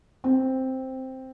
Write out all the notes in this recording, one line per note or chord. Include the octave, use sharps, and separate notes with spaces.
C4